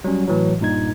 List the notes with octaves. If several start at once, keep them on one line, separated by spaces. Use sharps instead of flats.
F#3 G3 C#4
A2 E3 F#3
G2 A#2 D#4 G#6